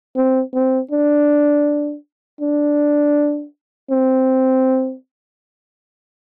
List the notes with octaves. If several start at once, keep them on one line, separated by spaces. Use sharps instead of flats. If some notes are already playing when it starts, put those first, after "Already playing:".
C4
C4
D4
D4
C4